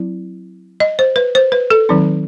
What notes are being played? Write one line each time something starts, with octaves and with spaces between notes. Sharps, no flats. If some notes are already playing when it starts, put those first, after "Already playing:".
Already playing: F#3 C4 E4
D#5
C5
B4
C5
B4
A4
D#3 F#3 C4 D#4